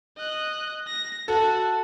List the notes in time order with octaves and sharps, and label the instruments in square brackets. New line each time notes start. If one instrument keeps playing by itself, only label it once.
[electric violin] D#5 F#6
A#6
[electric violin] F#4 [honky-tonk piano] A4